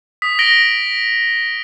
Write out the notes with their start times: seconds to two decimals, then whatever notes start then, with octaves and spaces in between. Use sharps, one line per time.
0.22 D#6 B6
0.39 A#6 D7 F#7 G7